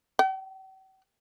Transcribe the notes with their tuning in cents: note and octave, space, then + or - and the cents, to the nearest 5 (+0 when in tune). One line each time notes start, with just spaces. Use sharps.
G5 -45